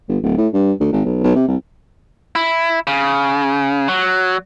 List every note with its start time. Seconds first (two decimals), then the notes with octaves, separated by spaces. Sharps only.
0.09 G1
0.23 D1
0.37 A2
0.53 G2
0.80 D2
0.92 G#1
1.05 B1
1.24 B1
1.36 C3
1.48 C2
2.36 E4
2.87 C#3
3.88 F#3